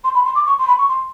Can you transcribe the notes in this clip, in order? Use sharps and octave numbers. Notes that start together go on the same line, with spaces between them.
C6
B5
C6
D6
C#6
C6
B5
C#6
C6